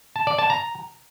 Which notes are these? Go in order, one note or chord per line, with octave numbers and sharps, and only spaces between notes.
A5
D5
A5
A#5